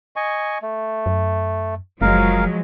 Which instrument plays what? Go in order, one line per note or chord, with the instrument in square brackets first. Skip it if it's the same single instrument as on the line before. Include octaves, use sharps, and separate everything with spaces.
[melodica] D#5 G#5 C#6
A3
[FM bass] F#2
[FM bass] F#1 [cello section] F3 F#3 G#3 [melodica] A#4 F5